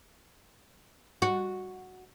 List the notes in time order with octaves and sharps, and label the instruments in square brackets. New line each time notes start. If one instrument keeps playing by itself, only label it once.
[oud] F#4